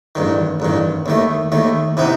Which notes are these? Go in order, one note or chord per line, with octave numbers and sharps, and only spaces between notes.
A1 G2 D#3
A1 G2 D#3
D#2 D#3 A3
D#2 D#3 A3
C3 E3 B3 D#4